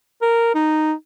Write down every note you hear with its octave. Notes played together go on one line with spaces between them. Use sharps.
A#4
D#4